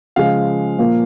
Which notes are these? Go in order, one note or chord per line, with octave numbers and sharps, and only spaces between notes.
C#3 F3 G#3 F5
A#2 F3 A#3